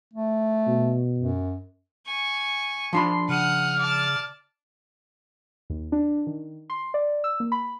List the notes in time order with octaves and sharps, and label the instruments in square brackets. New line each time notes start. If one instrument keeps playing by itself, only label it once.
[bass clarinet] A3
[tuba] B2
[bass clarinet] F#2
[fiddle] G#5 C#6
[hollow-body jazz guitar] F3 D4 B5 [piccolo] C6
[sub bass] C#3 [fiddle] F#5 D#6 [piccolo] F6
[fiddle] D5 A5
[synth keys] D#2
D4
D#3
C6
D5
E6
A#3
B5